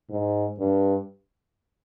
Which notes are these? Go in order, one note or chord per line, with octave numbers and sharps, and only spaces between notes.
G#2
G2